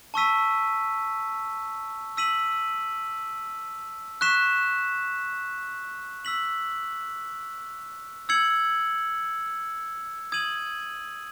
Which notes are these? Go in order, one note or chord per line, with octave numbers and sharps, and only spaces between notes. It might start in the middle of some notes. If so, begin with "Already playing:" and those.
A5 C#6 E6 B6 D#7
E6 B6 D#7 F#7
C#6 F#6 B6 E7
E6 B6 F#7
E6 G#6 C#7 F#7
D#6 G#6 D#7 F#7